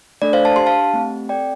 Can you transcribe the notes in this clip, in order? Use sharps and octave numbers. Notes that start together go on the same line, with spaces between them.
A3 D4 A4 D5
C5 F5
A5
D4 G4 C6
F5 A5
A3 C4 G4
C4 A4 D5 G5